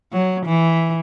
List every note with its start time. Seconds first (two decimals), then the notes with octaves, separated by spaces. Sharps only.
0.13 F#3
0.46 E3